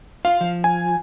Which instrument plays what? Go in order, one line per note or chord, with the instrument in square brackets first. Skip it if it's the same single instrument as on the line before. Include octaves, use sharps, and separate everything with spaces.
[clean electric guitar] F4 [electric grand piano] F5
[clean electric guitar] F3
[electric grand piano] G#5